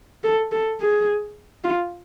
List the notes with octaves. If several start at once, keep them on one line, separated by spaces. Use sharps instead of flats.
A4
A4
G#4
F4